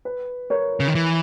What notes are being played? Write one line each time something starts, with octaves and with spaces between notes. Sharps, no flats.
B4
A#4 C#5
C#3
D#3
E3